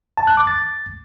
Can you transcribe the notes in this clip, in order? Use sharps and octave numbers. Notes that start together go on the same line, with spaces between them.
A5
F#6
D6
A6